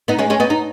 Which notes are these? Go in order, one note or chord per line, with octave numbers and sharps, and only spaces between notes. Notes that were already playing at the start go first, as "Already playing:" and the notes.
B3 D#4
G#3 C#4
G#3 C#4
B3 D#4
D#4